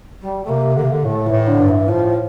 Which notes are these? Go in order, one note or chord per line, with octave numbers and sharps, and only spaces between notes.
G3
A3
C3 A#3
D3 A#3
C3
D3
A2 A3
E3
A2
D3
G2
E3
A2 F3